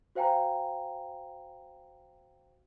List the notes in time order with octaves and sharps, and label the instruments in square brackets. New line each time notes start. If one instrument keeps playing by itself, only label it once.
[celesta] F#4 C5 F5 G5 G#5 A#5